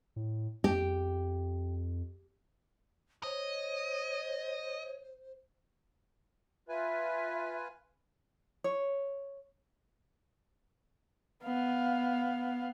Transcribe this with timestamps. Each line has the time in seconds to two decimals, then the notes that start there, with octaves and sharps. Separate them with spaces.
0.16 A2
0.64 F2 G4
3.23 C5 C#5 D#5
6.69 F4 B4 E5 G#5
8.64 C#5
11.43 B3 F5